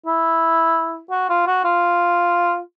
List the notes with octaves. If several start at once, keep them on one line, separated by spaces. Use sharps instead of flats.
E4
F#4
F4
F#4
F4